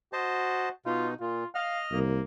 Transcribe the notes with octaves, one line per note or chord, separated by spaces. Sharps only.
F#4 C5 D#5 A5
B2 D#4 F4
A#2 F4
D#5 F5 F6
C2 A#3